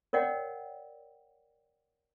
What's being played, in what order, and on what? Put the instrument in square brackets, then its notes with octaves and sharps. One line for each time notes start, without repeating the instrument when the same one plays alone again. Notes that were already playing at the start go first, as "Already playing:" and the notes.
[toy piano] A#4 C#5 D5 F#5 G5